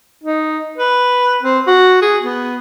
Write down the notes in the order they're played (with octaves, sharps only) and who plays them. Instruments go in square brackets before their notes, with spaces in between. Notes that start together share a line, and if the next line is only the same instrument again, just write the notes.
[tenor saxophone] D#4
B4
C4
F#4
G#4
B3